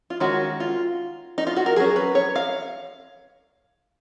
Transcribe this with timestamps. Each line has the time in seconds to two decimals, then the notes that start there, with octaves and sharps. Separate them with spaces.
0.10 F4
0.20 D#3 G#3 C#4 F#4
0.60 F4
1.38 D#4
1.47 F4
1.56 F#4
1.66 A#4
1.76 F#3 C#4 G#4
1.96 B4
2.15 C#5
2.36 F5